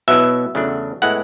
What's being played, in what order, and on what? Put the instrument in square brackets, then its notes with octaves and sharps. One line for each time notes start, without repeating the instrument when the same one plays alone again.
[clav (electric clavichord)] B2 F#3 B3 E4 E5
E2 C#3 F#3 A3 D4
A2 G#3 B3 E4 F#5